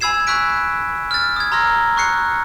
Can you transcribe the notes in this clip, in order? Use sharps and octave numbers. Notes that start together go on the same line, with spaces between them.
G#5 B5 E6 G#6 C7 E7
B5 C#6 E6 F#6 B6 D7
F6 A6
D#6 G#6
A#5 C6 E6 F6 A#6
C#6 F#6 C7 C#7